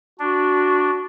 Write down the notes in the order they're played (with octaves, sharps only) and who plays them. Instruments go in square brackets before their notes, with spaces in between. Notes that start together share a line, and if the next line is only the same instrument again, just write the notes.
[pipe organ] D4 [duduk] F#4